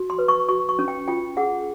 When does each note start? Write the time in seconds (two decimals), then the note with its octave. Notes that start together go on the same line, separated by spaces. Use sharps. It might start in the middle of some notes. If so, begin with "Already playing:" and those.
Already playing: F#4
0.10 C6
0.19 B4
0.28 C#6
0.49 F#4 C#6
0.69 C#6
0.79 C#4
0.88 G5
1.08 F4 G5
1.37 G#4 F#5